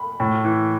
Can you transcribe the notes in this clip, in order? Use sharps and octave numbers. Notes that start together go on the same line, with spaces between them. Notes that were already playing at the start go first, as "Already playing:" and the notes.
Already playing: B5
A2
E3